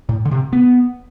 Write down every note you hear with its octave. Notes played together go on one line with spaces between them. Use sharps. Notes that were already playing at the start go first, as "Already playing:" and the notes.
A2
D3
C3
B3